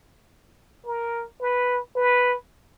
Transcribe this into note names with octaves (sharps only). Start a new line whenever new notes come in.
A#4
B4
B4